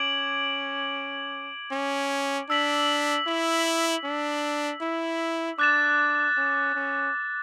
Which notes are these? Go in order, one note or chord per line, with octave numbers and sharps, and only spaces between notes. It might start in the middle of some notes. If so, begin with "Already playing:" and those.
Already playing: C#4 D6 G#6 D7 F#7
C#4
D4 E6 B6 F#7
E4
D4
E4
D4 D6 F#6 A6 E7
C#4
C#4